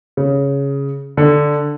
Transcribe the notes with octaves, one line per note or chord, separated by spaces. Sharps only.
C#3
D3